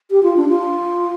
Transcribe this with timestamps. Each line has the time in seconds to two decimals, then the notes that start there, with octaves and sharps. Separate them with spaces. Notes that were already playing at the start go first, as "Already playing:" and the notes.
0.11 G4
0.23 F4
0.36 D4
0.48 F4